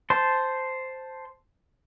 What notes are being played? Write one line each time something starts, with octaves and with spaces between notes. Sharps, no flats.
C5 A5 C6